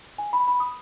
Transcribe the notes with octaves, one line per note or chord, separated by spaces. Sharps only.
G#5
B5
B5
D#6